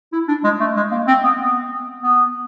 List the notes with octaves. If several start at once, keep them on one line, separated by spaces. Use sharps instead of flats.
E4
D4
G#3
A3
G#3
A#3
C4
B3
B3
B3